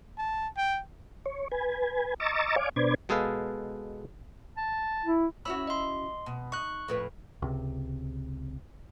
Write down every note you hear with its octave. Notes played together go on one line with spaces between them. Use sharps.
A5
G5
C#5
B4 G#5
D#5 A#5 C#6 D6 E6 A6
C#5 D5 F5 G#5 D6
B2 D4 B4 C5 D5 G#6
B2 G#3 G#4 A4 B4 F5
A5
E4
C#4 E4 F#4 B5 E6
D#5 C6
B2
D#4 C#6 F#6
F2 A2 B4
C#2 C3